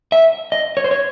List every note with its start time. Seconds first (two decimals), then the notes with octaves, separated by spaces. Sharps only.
0.12 E5
0.52 D#5
0.77 C#5
0.84 C5
0.91 C#5